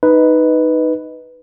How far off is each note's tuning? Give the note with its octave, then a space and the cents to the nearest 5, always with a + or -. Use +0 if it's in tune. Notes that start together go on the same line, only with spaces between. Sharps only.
D#4 +0 B4 +0 D#5 +10